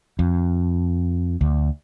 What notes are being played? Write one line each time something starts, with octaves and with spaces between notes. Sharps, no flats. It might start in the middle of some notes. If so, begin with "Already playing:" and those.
F2
D2